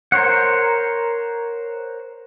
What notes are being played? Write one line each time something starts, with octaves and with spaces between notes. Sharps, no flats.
A#4 C5 C#5 F#5